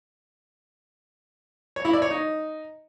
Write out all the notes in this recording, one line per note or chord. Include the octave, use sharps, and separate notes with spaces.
C#5
E4
D5
C#5
D#4